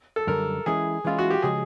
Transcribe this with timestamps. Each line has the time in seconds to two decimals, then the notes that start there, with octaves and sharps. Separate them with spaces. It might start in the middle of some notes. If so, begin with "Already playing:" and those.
0.16 A4
0.27 F#2 D3 G3 A#4
0.66 E3 G#3 C#4 E4 G#4
1.04 E3 G#3 C#4 E4 F4
1.18 F#4
1.30 G4
1.42 C#3 F3 G#3 G#4